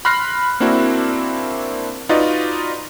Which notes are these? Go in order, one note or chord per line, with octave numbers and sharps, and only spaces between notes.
B5 C6 F6 F#6 A#6 C7
A#3 C4 D4 E4 F#4
D#4 F4 F#4 B4 D5 D#5